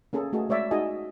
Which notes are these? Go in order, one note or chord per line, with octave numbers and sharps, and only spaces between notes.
A#3 C#4 G#4 A4
A3 A#3 F#4 G#4 D#5 A5
G#3 C#5 D5 E5
D#4 F#4 G#4 D#5 G#5 A5